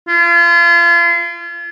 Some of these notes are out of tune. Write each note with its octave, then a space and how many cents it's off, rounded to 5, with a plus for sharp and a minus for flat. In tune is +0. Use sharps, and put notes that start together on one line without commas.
F4 -35